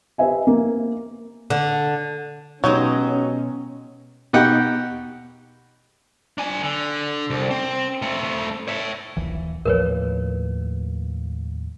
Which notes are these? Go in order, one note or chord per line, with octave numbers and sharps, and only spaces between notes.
G4 B4 C5 D#5 E5 G#5
A#3
D3
B2 F#3 G#3 C#4 D#4 G4
B2 D#4 G4 F#5 G5
D4 G#5
D3
C2
C4
A3 C4
C#5 E5
D#1 A#1 E3
D#2 A2 F3 A#4 B4 C#5